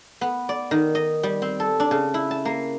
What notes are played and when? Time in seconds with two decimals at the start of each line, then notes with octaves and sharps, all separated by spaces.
0.21 B3
0.49 D5
0.71 D#3
0.95 D#5
1.23 G3
1.42 C4
1.60 A4
1.80 D4
1.91 C#3
2.14 E4
2.31 A5
2.45 A#3